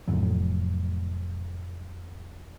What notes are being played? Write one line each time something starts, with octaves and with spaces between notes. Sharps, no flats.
F1 F2 A2 F#3